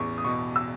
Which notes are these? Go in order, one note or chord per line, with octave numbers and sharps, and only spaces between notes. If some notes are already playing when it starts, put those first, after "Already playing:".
Already playing: A1 E2 C#6
D#6
B2 C#6
E6